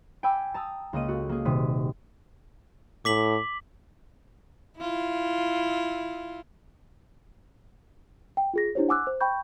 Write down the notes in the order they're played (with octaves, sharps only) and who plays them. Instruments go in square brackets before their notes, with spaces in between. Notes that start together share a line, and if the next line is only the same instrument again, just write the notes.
[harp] G5 G#5 B5 D6 E6
A5 A#5 D#6 E6
C#2 A#3 D#5 D#7
F#4 A4
A#3 G#4
D#1 C3 D#6 B6 D#7
[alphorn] A2 [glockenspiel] D6 B6 F#7
[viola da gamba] E4 F4
[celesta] G5
F4 G#4 A#6
D4 E4 G4 C5 C#5
F#5 G#5 D6 E6 F#6
C5
G5 B5 C#6 G6